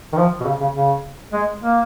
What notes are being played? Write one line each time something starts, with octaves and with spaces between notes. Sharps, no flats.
D#3
F3
B2
C#3
C#3
C#3
G#3
A#3